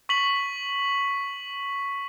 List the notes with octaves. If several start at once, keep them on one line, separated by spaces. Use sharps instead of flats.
C#6 B6 F#7